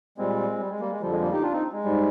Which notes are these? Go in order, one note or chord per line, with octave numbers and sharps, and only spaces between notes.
A#2 G3 G#3 C4
G3
G#3
G3 A#3
G#3
F2 D3 F3 G3
G#3
G3 A#3
D#4 G4
D4 F4
C4 D#4
G#3
G#2 G3